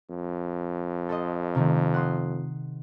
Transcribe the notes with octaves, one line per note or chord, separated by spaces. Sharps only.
F2
A4 C5 D#5
C3 D#3 A3
F#5 C6 D#6